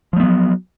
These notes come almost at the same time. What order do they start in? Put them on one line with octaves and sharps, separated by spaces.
F3 A3 B3 F#3